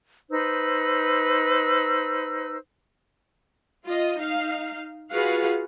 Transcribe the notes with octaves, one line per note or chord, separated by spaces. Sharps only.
D#4 B4 C5 E6
F4 D#5
D#4 F5
F4 F#4 G#4 B4 F5 F#5